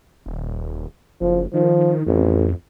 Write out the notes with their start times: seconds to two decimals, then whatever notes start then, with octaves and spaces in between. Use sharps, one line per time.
0.26 D#1
1.21 F#1 F3
1.54 D#3 F3
2.07 A1 F2